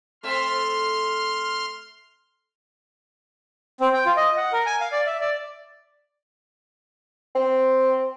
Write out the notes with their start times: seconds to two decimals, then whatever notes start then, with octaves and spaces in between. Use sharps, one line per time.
0.23 A3 C4 E5 C6 F6
3.81 C4
3.94 G5
4.06 F4
4.17 D#5
4.37 F#5
4.53 A#4
4.66 G#5
4.81 F5
4.92 D5
5.06 E5
5.20 D5
7.35 C4